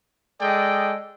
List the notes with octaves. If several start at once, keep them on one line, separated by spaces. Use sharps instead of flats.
G#3 A4 D5 D#5 G5